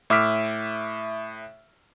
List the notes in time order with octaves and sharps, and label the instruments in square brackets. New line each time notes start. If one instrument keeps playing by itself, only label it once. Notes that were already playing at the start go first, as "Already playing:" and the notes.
[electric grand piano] A2 E5 D6 E6 F6 B6